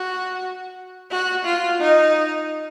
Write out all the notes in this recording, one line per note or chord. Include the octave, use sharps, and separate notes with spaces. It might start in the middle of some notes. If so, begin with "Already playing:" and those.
Already playing: F#4
F#4
F4
D#4